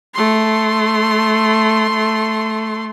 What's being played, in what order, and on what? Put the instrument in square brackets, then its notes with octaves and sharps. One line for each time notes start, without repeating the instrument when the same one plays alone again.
[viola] A3 C6